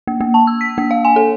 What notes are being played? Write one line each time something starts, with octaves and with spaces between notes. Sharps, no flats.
A#3
A#3
A5
E6
B6
A#3
F5
G#5
A4